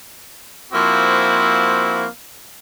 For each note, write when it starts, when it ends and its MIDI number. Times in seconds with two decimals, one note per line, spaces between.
0.72 2.05 53
0.72 2.05 58
0.72 2.05 60
0.72 2.05 64
0.72 2.05 66